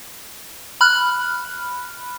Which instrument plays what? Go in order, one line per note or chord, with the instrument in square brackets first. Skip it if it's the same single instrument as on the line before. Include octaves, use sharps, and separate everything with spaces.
[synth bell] B5 F6 F#6